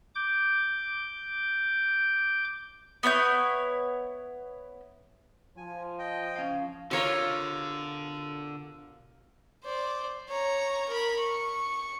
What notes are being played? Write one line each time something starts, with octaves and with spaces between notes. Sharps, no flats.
D6 G6
B3 E4 C#5 G6
F3 G#5
D#5 G5
C#4 F5
B2 D3 F4 A#4 C#5 F5
C5 D5
C#5 A#5
A#4 B5
C#6